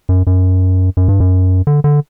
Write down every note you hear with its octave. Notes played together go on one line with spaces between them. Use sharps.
F#2
F#2
F#2
G2
F#2
D3
D3